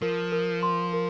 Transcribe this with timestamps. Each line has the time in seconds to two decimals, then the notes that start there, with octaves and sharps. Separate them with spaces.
0.02 F3 A#4
0.32 A#4
0.63 C6
0.93 A#4